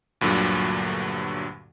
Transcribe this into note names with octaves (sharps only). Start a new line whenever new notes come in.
D2 G2 A#2 D3 F#3